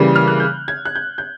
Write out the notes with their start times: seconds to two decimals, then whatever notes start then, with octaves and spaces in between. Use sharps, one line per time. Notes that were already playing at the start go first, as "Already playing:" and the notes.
Already playing: C#3 E3 G3 A#3
0.16 F6
0.28 F#6
0.40 G6
0.68 G#6
0.85 F#6
0.95 G6
1.18 G6